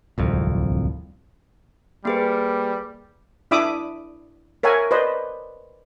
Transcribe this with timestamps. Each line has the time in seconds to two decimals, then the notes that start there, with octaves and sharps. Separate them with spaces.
0.18 D1 C2 F2
2.05 G3 A#3 G#4 B4
3.51 D4 E4 E5 B5 D6 D#6
4.63 A#4 C#5 E5 F#5 G#5
4.91 B4 C5 D5 D#5